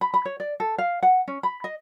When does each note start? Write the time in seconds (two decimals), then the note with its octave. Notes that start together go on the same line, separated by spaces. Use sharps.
0.01 B5
0.14 B5
0.25 C#5
0.40 D5
0.60 A4
0.78 F5
1.03 F#5
1.28 C#4
1.43 B5
1.64 D#5